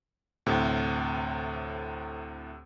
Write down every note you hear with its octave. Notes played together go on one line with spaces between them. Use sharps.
D2 A2 C3